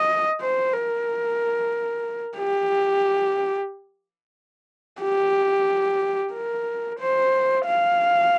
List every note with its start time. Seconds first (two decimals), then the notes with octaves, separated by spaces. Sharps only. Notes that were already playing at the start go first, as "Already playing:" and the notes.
Already playing: D#5
0.40 C5
0.73 A#4
2.38 G4
5.01 G4
6.33 A#4
6.99 C5
7.66 F5